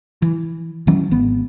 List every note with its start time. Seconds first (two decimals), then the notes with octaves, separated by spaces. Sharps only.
0.22 E3
0.87 D#3 E3 F#3 C#4
1.11 G#1 B3